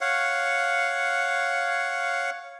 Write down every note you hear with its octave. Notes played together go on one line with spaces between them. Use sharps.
C#5 F5 F#5